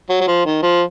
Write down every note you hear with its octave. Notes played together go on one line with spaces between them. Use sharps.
F#3
F#3
F3
D#3
F3